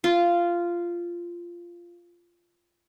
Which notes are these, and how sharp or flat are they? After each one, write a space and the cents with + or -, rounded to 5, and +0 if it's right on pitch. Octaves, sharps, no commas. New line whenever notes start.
F4 -10